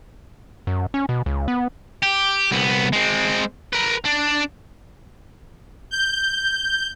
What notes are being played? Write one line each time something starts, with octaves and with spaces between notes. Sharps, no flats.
F#2
C#4
B2
C#2
B3
G4
C2 B3
G#3 C4
A#4 B4
D4
G6